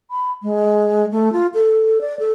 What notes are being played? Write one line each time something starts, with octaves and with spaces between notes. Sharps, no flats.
B5
G#3
A3
F4
A4
D5
A4